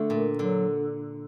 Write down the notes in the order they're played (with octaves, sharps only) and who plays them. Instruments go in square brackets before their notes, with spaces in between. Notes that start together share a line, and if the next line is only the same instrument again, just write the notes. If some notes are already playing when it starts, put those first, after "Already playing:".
Already playing: [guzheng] D3 [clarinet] A3
[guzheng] A#2
[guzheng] D3 [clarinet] F#3